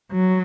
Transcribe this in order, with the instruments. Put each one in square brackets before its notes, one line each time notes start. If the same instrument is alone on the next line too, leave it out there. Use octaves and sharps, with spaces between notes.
[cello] F#3